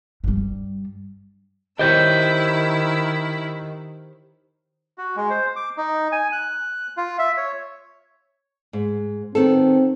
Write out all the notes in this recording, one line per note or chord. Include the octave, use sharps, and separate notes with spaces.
G2 G3
D#3 E4 G4 C5 C#5 D#5 E6 G6
F#4
G#3
C5
D6
D#4
G#5
F#6
F4
E5
C#5
G#2
D#3 B3 C4 A4